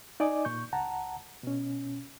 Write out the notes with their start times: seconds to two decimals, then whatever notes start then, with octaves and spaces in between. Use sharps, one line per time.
0.20 D#4 D5 D#5 G#5 D6
0.45 A#2 C#6 G6
0.73 C#2 F#5 A5 A#5
1.43 B2 C#4